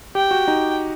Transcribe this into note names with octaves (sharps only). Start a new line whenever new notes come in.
G4 G5
F#4
D#4